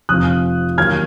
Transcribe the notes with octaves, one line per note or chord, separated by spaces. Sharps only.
F1 F2 F3 D#6 F#6
D#2 D#3 F#3 F6 G#6